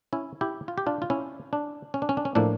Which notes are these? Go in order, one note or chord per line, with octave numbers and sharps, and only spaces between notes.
C#4 E4
E4 G4
F4
G4
D4 F4
F4
C#4 E4
D4
C#4
D4
C#4
D4
C#4
A2 F3 A#3 D4